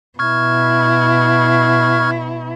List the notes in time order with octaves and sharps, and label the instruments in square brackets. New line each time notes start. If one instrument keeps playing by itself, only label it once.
[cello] B2 E4 [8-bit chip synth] C#6 F6 G#6